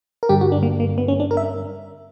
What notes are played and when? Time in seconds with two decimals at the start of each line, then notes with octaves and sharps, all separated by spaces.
0.23 A#4
0.29 G2 D3 G3 G4
0.41 F#4
0.52 D4
0.63 A#3
0.80 A#3
0.98 B3
1.08 C#4
1.20 D4
1.31 A#4
1.37 E5